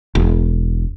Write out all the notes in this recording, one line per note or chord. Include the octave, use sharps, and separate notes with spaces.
E1